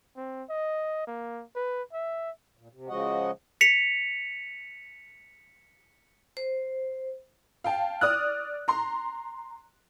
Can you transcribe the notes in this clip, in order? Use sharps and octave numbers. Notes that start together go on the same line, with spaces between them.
C4
D#5
A#3
B4
E5
A#2
C3
C#3 F3 G#3 F#4 D#5 F#5
B6 C#7 F7
C5
F5 G5 A5
D5 D#6 F6 F#6
A#5 C6